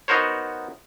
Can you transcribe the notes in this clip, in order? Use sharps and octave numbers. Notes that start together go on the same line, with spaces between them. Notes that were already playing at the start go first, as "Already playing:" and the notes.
B3 D#4 F#4 A#4 C5 C#5